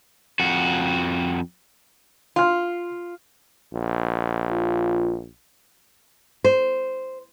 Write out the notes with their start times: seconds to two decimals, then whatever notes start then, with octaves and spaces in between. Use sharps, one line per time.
0.40 F2 F#4
2.36 F4 C6 F6
3.73 A#1
4.49 F4
6.44 C5